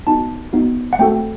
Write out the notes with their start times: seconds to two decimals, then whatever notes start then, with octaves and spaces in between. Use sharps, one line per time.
0.07 B3 D#4 F#4 A5
0.53 B3 D#4 F#4
0.93 F#5
0.99 A3 C4 F#4 A4 G5